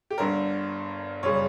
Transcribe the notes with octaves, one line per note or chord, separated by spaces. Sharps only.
G4
G1 G2 D3 A#4
F#1 C#3 G3 C#5